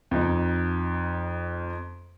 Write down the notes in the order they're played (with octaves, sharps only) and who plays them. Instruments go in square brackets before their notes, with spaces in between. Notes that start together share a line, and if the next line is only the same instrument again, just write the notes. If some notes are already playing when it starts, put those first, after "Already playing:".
[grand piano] F2 D#4